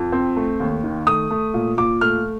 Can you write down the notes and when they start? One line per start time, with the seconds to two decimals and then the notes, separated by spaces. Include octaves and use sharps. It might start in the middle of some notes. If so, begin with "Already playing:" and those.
Already playing: F2
0.12 C4
0.37 A3
0.60 D#2
0.84 D#3
1.07 A3 D#6
1.31 A3
1.54 A#2
1.78 A#2 D6
2.01 A3 F6